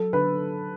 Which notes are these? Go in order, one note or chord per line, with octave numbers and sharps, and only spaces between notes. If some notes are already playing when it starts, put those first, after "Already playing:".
Already playing: F#3 A4
D3 B4